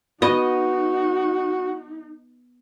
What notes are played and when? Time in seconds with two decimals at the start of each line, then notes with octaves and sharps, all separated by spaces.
0.22 B3 D#4 F#4 D#5